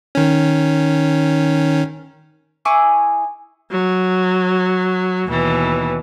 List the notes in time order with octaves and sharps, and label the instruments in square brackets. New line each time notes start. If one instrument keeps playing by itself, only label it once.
[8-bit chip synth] D#3 C#4
[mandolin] E4 G#4 C#6 D6
[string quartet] F#3
D#2 B2 E3